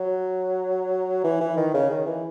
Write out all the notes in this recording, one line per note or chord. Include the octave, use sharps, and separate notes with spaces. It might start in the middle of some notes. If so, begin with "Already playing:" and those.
Already playing: F#3
E3
E3
D#3
C#3
D#3
E3